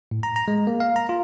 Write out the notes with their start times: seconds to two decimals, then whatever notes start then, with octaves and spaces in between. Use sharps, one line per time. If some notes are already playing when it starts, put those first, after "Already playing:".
0.11 A2
0.23 A#5
0.36 A#5
0.48 G#3
0.67 A#3
0.80 F5
0.96 A#5
1.09 F4